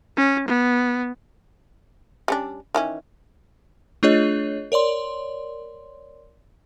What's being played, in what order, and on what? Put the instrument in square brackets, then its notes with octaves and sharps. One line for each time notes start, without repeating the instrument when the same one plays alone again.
[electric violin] C#4
B3
[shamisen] G3 C#4 D4
D#3 E3 C#4
[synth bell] A3 D4 F4 G#4 C#5 D#5
A#4 C#5 D5 C6